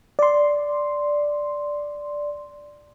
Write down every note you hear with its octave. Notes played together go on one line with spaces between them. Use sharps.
D5 C6